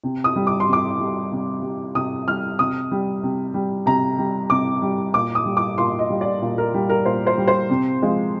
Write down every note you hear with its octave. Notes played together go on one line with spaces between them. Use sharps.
C3
D#6
G3
D6
C6
C3
D6
G3
C3
G3
C3 D#6
G3 F6
C3 D#6
G3
C3
G3
C3 A#5
G3
C3 D6
G3
A#2 D6
D#6
G3
D6
A#2 C6
D#5
G3
D5
A#2
A#4
G3
A#4
A#2 C5
C5
G3
C5
C3
F3 G#3